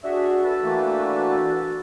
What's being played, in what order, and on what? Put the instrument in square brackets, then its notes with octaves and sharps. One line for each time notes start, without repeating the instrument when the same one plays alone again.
[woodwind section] D4 G#4 E5 [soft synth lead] F#4
[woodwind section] D4 A4 B4
[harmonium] E3 A3 A#3